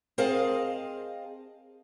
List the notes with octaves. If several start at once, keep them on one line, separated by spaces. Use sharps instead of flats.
C4 G#4 A#4 D#5 F5 A5